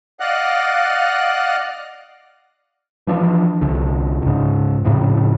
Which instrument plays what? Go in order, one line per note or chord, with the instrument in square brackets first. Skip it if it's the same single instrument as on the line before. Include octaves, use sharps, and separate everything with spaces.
[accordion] D5 D#5 F5 F#5 F#6
[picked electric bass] E3 F3 D4
C2 D3
C#2 G#2
F2 A2 C#3